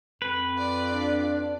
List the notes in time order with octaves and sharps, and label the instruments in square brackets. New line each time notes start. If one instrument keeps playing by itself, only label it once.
[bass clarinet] F2 [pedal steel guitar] B4
[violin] F4 D5
[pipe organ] D4